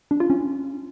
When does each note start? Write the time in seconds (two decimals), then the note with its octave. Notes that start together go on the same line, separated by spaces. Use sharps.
0.11 D4
0.20 F4
0.30 C#4